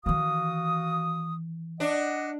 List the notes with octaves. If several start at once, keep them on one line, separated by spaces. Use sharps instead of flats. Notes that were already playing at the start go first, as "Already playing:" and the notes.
D#3 E3 F#4 F5 D#6
D4 D#5 F#5